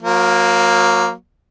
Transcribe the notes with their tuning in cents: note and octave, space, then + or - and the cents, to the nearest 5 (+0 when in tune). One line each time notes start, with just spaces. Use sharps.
F#3 -35 A#3 +0